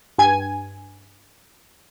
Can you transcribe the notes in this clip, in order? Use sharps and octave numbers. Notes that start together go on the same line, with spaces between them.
G2 G#5 G#6